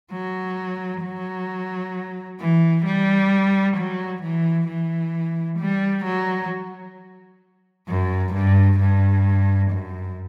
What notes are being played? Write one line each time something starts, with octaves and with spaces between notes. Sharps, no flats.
F#3
F#3
E3
G3
F#3
E3
E3
G3
F#3
F#2
G2
G2
F#2